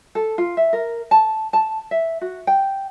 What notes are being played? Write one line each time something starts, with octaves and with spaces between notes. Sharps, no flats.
A4
F4
E5
A#4
A5
A5
E5
F#4
G5